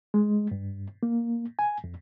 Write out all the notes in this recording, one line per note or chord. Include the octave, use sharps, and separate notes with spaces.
G#3
G2
A#3
G#5
F2